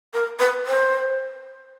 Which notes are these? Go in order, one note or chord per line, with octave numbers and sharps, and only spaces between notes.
A#4
B4
C5